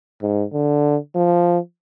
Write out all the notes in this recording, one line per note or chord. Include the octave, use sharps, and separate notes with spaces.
G#2
D3
F3